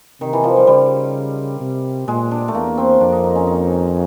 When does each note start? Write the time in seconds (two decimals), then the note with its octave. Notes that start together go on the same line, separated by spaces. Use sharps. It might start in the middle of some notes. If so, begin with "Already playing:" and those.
0.21 C3 D#3
0.33 E3
0.44 F3
0.56 G3
0.67 C#3 G3
1.61 C3
2.08 A#2 G#3
2.31 D4
2.48 A3
2.54 E2 A#3
2.77 C4
3.00 F2 D4
3.12 D#4
3.24 D#4
3.35 C#4
3.47 D#4